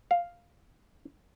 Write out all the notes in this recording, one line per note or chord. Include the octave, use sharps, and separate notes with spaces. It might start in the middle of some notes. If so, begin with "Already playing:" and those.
F5